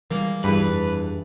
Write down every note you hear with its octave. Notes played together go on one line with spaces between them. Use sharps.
E3 G3 G#3 A#3
E2 G2 B4
F2 D4